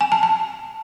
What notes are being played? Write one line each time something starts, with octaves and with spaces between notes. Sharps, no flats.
G#5
A5
A5